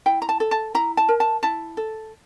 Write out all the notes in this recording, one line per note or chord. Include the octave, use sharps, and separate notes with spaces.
E4 G5
A#5
A5
A4
A5
E4 A#5
A5
A#4
A5
E4 A5
A4